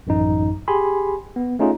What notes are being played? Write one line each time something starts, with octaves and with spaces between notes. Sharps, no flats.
A1 F#2 D#4
G4 G#4 G#5 B5 C6
B3
A3 C#4 D#4 F4 G#4